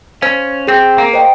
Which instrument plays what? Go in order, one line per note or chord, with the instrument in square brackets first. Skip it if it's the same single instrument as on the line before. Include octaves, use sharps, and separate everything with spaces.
[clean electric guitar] C#4 [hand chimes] C5 F5
[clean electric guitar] C4 [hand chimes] G#4
[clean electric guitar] A#3
[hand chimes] C5 D#5 G5